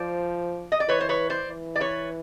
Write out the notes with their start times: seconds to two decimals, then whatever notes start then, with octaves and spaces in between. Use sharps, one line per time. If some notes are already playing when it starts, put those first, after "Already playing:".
Already playing: F3 C5 D5
0.72 D#5
0.80 D5
0.88 E3 B4 C#5
1.01 C5
1.09 B4 C#5
1.30 C5 D5
1.50 E3
1.76 D5
1.80 B4 C#5